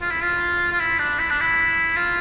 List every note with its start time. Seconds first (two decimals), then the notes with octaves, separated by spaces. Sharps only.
0.01 F4
0.11 E4
0.22 F4
0.72 F4
0.80 E4
0.99 D4
1.19 E4
1.30 D4
1.41 E4
1.97 F4